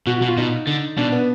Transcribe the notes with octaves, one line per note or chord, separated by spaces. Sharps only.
B2 F#4
B2 F#4
F4
B2 D#4
D3
B2 D4
B3